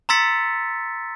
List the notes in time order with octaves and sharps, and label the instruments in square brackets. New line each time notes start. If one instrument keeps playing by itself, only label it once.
[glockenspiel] A#5 C6 E6 A6 B6 C#7